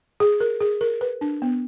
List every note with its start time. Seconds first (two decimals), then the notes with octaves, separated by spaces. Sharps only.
0.20 G#4
0.40 A#4
0.61 G#4
0.81 A#4
1.01 B4
1.21 D4
1.42 B3